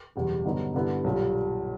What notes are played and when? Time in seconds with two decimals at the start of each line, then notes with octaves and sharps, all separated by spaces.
0.16 F#1 E2 B2 G3
0.44 G2 D3 F#3 B3 D#4
0.74 G2 D3 G3 B3 E4
1.04 B1 A#2 G3